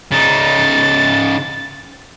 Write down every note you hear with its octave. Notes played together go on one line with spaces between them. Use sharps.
C#3 D#4 A6